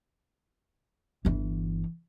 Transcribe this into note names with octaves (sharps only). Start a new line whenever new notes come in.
G1 E3